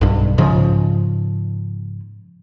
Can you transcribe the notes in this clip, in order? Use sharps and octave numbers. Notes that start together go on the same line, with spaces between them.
B1 G2
G#2 C#3 F3